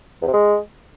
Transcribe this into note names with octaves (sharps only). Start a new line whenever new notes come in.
E2
C3
G#3